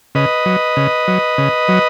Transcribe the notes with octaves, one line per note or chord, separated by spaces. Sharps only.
C#3 B4 D#5
F#3
C#3
F#3
C#3
F#3